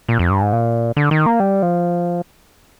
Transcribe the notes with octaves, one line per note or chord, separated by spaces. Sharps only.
A#2
F2
G2
G#2
A#2
D3
D#3
A#3
G3
F3